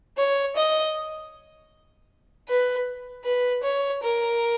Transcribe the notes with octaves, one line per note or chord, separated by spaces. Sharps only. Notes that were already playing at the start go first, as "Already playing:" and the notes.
C#5
D#5
B4
B4
C#5
A#4